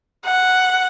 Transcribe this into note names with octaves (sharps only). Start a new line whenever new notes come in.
F#5